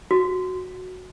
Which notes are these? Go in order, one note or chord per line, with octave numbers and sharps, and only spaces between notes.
F#4